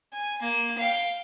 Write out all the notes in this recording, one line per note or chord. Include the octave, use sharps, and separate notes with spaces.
G#5
A#3
F5 G5